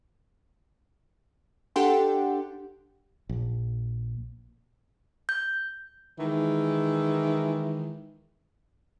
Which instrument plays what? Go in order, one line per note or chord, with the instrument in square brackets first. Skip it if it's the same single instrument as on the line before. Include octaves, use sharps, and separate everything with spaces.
[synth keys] D4 G4 A4 F#5 G5 C6
[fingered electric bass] A#1
[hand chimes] G6
[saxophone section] D#3 E3 G#3